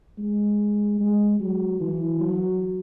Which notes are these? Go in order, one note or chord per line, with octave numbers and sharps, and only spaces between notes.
G#3
G#3
F#3
E3
F#3